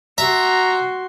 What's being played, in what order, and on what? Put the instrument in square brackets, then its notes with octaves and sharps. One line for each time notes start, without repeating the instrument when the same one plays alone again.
[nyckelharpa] F#4 C6 [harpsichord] E5 [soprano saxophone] A#5